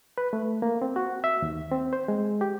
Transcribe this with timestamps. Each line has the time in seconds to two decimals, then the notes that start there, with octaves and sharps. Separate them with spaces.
0.18 B4
0.33 A3
0.62 A#3
0.82 C4
0.96 F#4
1.24 E5
1.42 D#2
1.71 C4
1.93 C5
2.08 G#3
2.41 G4